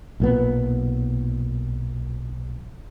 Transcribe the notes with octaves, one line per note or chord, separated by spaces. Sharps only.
B1 A#2 B3